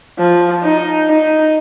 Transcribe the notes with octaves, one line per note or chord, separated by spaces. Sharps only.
F3
D#4
D#4